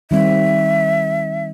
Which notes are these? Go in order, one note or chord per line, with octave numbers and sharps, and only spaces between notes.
D#3 G3 C4 E5